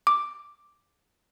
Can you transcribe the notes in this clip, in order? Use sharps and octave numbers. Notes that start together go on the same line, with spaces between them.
D6